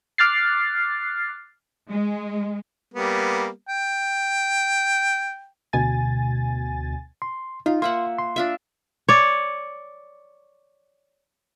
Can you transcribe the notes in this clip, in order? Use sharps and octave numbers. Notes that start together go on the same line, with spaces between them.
D6 F6 F#6 A6 C7
G#3
G3 A#3 B3
G5
D2 B2 G#5 A6
C6
D#4 F4
A#3 E5 F#5 C6
C6
D4 F4 E5
C#5 D5